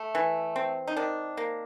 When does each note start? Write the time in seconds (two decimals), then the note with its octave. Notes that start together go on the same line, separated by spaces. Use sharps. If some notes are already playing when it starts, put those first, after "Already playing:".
Already playing: A3
0.15 E3
0.56 C4
0.87 D#4
0.96 D#3 D4
1.37 A#3